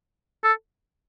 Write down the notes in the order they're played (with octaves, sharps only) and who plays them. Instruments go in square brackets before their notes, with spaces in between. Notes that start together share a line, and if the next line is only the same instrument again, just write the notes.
[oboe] A4